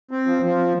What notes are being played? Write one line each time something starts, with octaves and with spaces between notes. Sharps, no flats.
C4
F3
F3